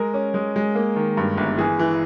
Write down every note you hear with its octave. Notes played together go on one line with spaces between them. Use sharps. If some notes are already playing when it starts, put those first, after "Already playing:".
Already playing: G#3 A#4
C#4
G#3
G#3
A#3
D#3
G2
G1
E3 G#4
E3